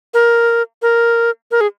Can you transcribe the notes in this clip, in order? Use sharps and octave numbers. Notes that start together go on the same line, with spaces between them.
A#4
A#4
A#4
G#4